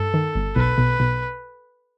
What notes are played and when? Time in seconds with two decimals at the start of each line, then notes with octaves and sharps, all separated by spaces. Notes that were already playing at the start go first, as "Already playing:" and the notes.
Already playing: G2 A4
0.14 D#3
0.35 G1
0.56 B1 B4
0.78 B1
1.00 B1